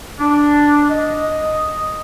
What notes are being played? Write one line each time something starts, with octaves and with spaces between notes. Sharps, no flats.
D4
D#5